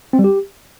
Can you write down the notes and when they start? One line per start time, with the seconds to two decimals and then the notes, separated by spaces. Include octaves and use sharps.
0.13 C4
0.19 G3
0.24 G4